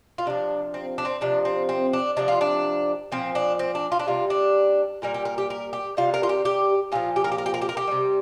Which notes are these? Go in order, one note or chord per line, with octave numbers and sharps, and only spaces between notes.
F4
C3 F3 D4
C4
D4
C4
C3 F3 D4
C4
C4
D4
C3 F3 D4
F4
D4
A#2 F3 C4
D4
C4
D4
F4
D4
C3 G3 F4
D4
A#2 G3 A#4
G4
A#4
G4
A#4
G4
C3 G3 F4
A#4
F4
G4
G4
A#2 F3 F4
G4
A#4
G4
A#4
G4
A#4
G4
A#4
G4
C3 G3